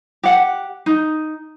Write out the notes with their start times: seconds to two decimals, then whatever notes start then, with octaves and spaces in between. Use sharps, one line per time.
0.23 G4 F#5
0.86 D#4